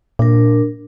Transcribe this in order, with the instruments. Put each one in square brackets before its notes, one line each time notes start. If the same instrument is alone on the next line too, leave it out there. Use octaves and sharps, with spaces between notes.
[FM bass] A#2 [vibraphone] D4 A#4